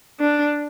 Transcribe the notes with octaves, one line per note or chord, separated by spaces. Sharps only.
D4